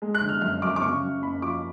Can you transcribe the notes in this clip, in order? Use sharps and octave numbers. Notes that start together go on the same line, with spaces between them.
G#3
F#6
D3
F6
F#2 F6
F#2 D6
D6
C#3 C#6
F#2
F#1 B5
F3 D6